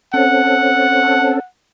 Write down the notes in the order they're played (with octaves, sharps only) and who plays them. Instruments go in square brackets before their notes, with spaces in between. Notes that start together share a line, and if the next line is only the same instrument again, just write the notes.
[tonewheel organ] C4 C#4 A4 [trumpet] F#5